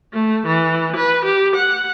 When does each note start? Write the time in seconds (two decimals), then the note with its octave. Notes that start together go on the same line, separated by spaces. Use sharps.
0.13 A3
0.46 E3
0.96 B4
1.25 G4
1.55 F#5